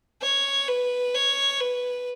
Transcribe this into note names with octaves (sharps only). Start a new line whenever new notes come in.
C#5
B4
C#5
B4